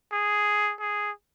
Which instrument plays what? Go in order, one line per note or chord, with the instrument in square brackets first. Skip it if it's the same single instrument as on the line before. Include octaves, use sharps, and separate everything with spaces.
[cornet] G#4
G#4